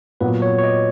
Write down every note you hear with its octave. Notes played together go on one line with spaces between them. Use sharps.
A#2 F#3 B3 B4
C#5
C#5
D#5